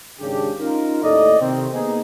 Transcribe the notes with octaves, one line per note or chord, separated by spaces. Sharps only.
G#1 C#3 D4 G4
C#4 D#4 F4 A#4
D#2 A2 A3 A4 D5 D#5
C3 D#3 C4
A#3 B3 D#4 G#4